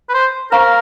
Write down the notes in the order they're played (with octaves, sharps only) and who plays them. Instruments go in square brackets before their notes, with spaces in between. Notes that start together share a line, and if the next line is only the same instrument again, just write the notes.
[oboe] B4
C5
[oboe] A#4 [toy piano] C5 F5 A#5 C#6